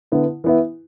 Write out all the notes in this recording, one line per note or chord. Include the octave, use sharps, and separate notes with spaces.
D3 B3 E4
E3 B3 E4